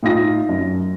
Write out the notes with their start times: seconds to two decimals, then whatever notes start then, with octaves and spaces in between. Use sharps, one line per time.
0.03 A2 D#4 F4 A#6
0.49 F#2